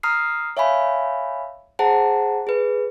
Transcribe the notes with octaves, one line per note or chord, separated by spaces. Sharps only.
A#5 D#6 F6 C7
C#5 E5 F5 G#5 B5
G#4 C5 F#5 A5 A#5
G#4 B4